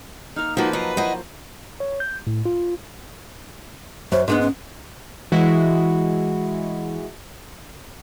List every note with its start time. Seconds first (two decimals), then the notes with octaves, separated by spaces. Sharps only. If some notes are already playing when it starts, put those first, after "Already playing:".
0.36 A#3 D#4 F6
0.57 F3 A#3 D#4 F#4 B4 C5 B5
0.73 F#3 A#4 C5 D#5
0.97 E4 F#4 C5 D#5
1.80 C#5
2.00 G6
2.27 A2
2.45 F4
4.12 F#2 C5
4.28 G#2 G#3 B3 D4
4.41 C#4
5.32 E3 G#3 E4 F#4